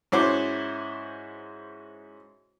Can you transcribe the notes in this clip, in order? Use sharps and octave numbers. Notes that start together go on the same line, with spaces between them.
G#2 C#4 E4 F#4 C5 D6